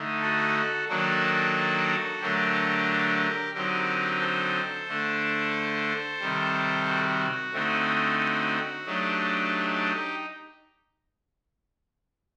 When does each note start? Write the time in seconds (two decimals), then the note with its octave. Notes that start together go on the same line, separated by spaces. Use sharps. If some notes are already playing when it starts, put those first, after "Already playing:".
Already playing: D3 A3 D#4
0.22 F#4 A4
0.88 D#3 F#3 A#3 D4 F#4 A4
2.21 D3 F#3 A3 D4 G4 A#4
3.54 D3 F#3 C4 D#4 G4 A#4
4.20 A4 C5
4.87 D3 A3 D4
6.20 C3 D#3 G3
6.87 F#4
7.53 D3 A3 C4 D#4
8.20 F#4
8.86 F#3 A3 D4 D#4 G4